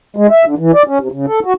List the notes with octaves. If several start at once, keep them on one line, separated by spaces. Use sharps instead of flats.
G#3
E5
D3
E3
D5
C#4
C3
C#3
A4
F#4